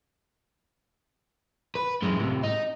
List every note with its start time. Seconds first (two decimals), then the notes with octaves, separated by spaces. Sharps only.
1.75 B4
2.02 F#2 G#3
2.20 A2 C3
2.44 D#4